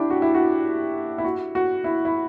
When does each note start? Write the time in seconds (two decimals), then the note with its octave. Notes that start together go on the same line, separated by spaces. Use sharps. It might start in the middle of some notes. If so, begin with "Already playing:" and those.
Already playing: D4 E4 G4
0.10 F#4
0.22 E4
0.35 F#4
1.18 E4
1.24 F#4
1.55 F#4
1.84 E4
2.05 E4